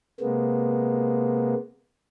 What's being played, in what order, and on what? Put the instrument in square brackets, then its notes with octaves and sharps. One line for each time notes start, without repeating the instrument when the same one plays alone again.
[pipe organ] C3 G#3 A#3 B3